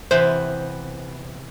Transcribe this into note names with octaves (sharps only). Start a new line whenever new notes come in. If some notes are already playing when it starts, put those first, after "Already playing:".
C3 E3 B3 C5